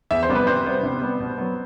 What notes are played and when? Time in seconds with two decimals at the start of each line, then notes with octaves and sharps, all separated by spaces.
0.11 E2 E5
0.23 C5
0.30 C3 G3 B3
0.35 B4
0.47 C3 C5
0.66 G3 B3
0.83 C3
1.01 G3 B3
1.20 B2
1.38 F#3 B3